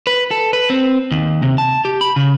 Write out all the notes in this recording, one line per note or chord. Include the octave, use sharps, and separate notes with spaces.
B4
A4
B4
C4
D#2
C3
A5
G4
B5
C#3